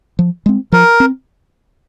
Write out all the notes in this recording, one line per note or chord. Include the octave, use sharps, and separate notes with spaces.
F3
G#3 C4
F3 A#4
C4